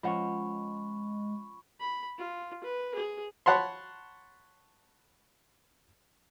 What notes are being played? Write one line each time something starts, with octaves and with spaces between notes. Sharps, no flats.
F3 G#3 C#4 D#5 F#5 B5 C#6
B5
F4
B4
G#4
C#5 F#5 A5 B5 C6